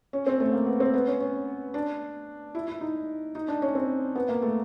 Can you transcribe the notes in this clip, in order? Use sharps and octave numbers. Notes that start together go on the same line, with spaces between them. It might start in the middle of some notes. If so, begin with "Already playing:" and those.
C#4
C4
A3
A#3
B3
C4
B3
C#4
C#4
D4
E4
E4
D#4
D#4
D4
C#4
C4
B3
A#3
A3